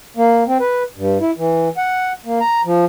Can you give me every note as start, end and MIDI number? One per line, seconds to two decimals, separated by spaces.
0.17 0.44 58
0.47 0.58 60
0.60 0.83 71
0.96 1.18 43
1.21 1.31 64
1.38 1.69 52
1.77 2.13 78
2.25 2.40 58
2.40 2.61 82
2.65 2.85 53